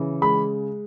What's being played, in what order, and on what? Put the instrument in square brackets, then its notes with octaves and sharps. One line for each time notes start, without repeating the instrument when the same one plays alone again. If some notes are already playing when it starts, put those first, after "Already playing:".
Already playing: [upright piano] C#3 E3
G#3 B5